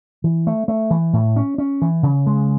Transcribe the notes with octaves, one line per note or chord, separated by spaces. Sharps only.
E3
A3
A3
E3
A2
C#4
C#4
E3
C#3
G#3